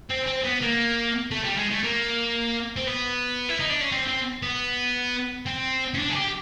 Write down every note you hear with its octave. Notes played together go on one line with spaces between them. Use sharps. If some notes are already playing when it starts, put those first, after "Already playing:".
C4
C4
B3
A#3
A3
G3
G#3
A3
A#3
C4
B3
E4
D#4
D4
C#4
C4
C4
B3
C4
C#4
D4
G#4
G4